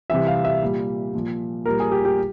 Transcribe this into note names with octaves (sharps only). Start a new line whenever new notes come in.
C3 E3 G3 E5
F5
E5
A#2 G3
A#2 F3
A#2 G3 A#4
G#4
G4
G4